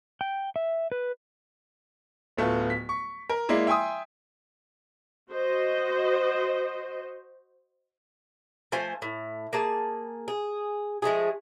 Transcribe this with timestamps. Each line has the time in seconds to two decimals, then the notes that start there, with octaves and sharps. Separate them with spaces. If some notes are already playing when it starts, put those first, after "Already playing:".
0.21 G5
0.56 E5
0.92 B4
2.37 D1 A3 B3 F4
2.70 B6
2.89 C#6
3.29 A#4
3.49 G#3 A#3 E4 D5
3.67 E5 G5 G#5 C6 D#6
5.31 F#4 C5 D#5
8.72 F3 A3 C5 G#5
9.02 A2
9.53 A#3 G#4 A5
10.28 G#4
11.02 F3 G#3 A3 G#4